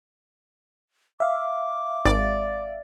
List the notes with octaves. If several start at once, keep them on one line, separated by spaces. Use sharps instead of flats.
E5 F5 D6
G#1 D5